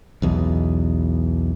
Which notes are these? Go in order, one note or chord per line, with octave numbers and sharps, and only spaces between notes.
B1 E2 B2